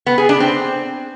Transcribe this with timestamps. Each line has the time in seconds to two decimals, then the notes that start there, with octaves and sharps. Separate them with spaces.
0.06 B3
0.18 G#4
0.29 D4
0.40 C4